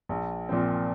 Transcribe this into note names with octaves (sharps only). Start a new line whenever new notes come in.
A#1
A#2 F3 C4